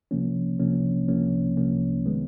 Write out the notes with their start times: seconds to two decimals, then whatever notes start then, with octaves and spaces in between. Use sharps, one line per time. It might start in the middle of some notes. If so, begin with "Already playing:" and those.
0.11 C2 C3 F3 A#3 C#4
0.59 C2 C3 F3 A#3 C#4
1.08 C2 C3 F3 A#3 C#4
1.57 C2 C3 F3 A#3 C#4
2.06 D#3 G#3 B3